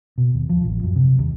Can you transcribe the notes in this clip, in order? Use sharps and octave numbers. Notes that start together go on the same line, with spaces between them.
B2
D#2
F3
A1
F#2
C3
D#2